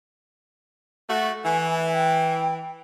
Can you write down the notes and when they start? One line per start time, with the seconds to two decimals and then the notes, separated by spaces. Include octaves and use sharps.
1.09 A3 F#4
1.44 E3 G#5
1.93 G5